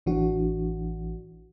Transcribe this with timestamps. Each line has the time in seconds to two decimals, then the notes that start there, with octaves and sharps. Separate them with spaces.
0.06 A1 E3 D4 F#4